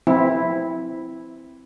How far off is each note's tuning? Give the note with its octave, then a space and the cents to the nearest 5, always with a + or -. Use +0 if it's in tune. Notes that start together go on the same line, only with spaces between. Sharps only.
F3 +35 C4 +0 E4 +0